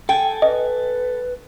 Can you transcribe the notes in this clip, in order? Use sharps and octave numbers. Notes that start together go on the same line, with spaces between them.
A4 G5 G#5
B4 D#5